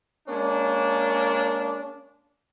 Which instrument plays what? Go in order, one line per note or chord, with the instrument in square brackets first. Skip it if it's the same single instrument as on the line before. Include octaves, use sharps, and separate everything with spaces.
[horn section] G#3 A#3 C#4 D4